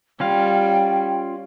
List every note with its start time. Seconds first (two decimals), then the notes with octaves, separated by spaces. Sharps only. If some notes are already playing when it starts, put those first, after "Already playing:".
0.20 G3 C#4 F4 F5 G5